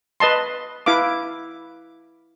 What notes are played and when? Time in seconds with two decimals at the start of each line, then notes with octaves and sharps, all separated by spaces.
0.20 B4 D#5 A5 C6
0.86 E4 B4 F5 D6